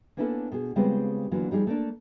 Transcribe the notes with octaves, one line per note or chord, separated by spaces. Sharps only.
A#3 B3 C#4 D4 E4 A4
B2 G#4
C#3 G3 G#3 B3 C4 F4
D3 E3 F#3 A#3 F4
F3 G3 D#4 G#4
A3 A#3 D4